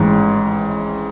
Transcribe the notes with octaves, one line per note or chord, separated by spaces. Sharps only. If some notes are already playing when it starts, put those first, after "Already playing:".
Already playing: A1 G#2 E3